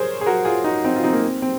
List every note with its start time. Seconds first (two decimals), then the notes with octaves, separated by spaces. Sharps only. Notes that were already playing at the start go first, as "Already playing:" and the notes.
Already playing: G#4 A#4 C5 C#5
0.21 G#4
0.26 F#4 A#4
0.45 F4 G#4
0.64 D#4 F#4
0.84 C4 D#4
0.96 F4
1.03 C4 D#4
1.13 A#3
1.23 C4
1.42 C4